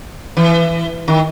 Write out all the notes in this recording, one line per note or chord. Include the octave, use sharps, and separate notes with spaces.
E3
D#3